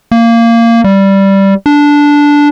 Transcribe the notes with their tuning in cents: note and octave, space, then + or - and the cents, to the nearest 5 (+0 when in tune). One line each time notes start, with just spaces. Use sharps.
A#3 -15
G3 -5
D4 -10